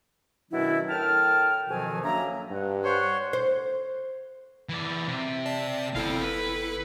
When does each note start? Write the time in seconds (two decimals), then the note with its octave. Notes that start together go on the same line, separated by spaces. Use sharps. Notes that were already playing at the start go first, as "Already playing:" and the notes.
0.51 B2 D#3 F#3 C#4 D4 E4
0.89 A2 A#4 G5 A5 F6
1.68 F2 B2 D#3 F3 F#3 G#5
2.04 F#2 A#3 D4 E5 A#5
2.51 G2 F#5
2.84 C5 C#5 F#5
3.33 C5
4.69 E3 D5
5.07 C3
5.46 D5 A5
5.95 G1 C4 E4 A4 F5
6.22 B4